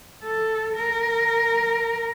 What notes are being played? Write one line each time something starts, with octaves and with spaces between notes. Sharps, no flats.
A4
A#4